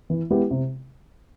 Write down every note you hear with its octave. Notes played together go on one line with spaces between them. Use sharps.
E3
G#3 B3 E4 G4
C3